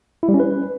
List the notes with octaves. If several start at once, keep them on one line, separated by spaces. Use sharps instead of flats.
E4
G3
C#4
B4